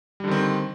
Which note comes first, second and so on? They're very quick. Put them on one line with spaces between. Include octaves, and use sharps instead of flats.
G3 D3 D#3 C4